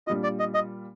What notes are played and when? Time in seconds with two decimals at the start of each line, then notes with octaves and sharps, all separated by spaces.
0.07 A#2 G3 D4 F4 D#5
0.23 D5
0.39 D#5
0.54 D#5